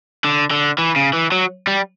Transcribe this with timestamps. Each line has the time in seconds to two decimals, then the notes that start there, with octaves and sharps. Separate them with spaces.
0.24 D3
0.51 D3
0.78 E3
0.96 C#3
1.13 E3
1.32 F#3
1.67 G3